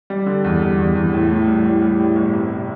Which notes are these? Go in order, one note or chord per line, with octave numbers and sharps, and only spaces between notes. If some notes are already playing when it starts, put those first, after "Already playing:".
G3
D3
E2
G3
E2
E2
A2
A2
G3
A2
G3
A2
G1
C3